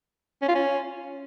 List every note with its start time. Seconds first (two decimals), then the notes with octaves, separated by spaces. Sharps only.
0.42 C#4
0.48 F4
0.55 C#4